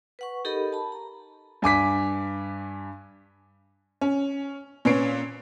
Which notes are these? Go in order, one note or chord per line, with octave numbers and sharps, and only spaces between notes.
B4 F#5 C#6
D#4 G4 A4 A#4 D#5 B5
A5 B5
A#5
G2 G#5 D6 B6
C#4
A#2 C#4 B4 C#5 C7 D7